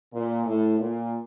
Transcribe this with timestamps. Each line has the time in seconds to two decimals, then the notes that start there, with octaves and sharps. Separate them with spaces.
0.13 A#2
0.45 A2
0.79 A#2